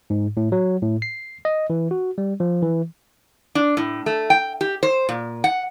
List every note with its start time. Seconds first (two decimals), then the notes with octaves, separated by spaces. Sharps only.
0.10 G#2
0.37 A2
0.52 F#3
0.83 A2
1.02 C7
1.45 D#5
1.70 E3
1.91 F#4
2.18 G3
2.40 F3
2.62 E3
3.55 D4
3.77 A2
4.06 A3
4.30 G5
4.61 G4
4.83 C5
5.09 A#2
5.44 F#5